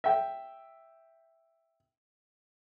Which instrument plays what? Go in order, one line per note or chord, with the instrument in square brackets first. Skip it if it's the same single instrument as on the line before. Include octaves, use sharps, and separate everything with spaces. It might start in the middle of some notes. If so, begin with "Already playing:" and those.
[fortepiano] E5 G5